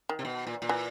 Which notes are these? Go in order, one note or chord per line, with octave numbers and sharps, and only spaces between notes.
D#3
C3
B2
A#2
A#2
E3